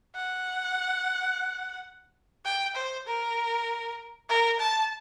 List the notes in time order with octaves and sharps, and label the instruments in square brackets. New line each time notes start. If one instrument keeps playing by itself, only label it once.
[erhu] F#5
G5
C5
A#4
A#4
A5